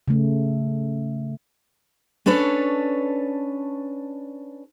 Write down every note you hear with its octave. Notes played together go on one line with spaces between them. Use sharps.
C#3 A3
C#4 D4 A4 B4 C#5